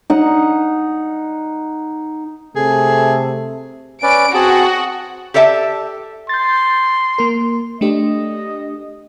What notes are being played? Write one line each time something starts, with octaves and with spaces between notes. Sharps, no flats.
D#4 F#5
C3 A3 G#4 A4
C#4 B4 D5 D7
C4 F#4 G#4 A5
G4 A4 D5 E5 G5 A5
C6 G6 A6
A#3 A#4
A3 D4 G4 D#5